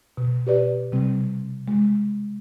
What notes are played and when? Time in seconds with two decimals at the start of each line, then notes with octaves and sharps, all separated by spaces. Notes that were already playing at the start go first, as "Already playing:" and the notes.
0.17 B2
0.47 G4 B4 D5
0.92 C3 G3 C4
1.68 G#3